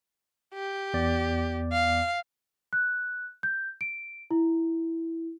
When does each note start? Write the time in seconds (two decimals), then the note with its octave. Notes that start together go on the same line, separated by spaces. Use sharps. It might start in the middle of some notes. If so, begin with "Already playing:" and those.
0.54 G4
0.94 E2 B3 D5
1.72 F5
2.73 F#6
3.43 G6
3.81 D7
4.31 E4